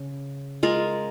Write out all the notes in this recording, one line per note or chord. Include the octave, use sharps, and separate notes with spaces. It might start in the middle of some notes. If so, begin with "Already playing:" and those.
Already playing: C#3
G#3 F4 A#4